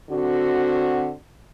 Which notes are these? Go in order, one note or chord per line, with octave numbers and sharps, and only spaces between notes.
D3 C4 F#4